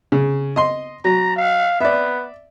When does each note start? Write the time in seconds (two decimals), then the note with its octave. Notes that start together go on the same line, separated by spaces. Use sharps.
0.12 C#3
0.56 D#5 C6
1.05 F#3 A#5
1.36 F5
1.80 B3 D5 E5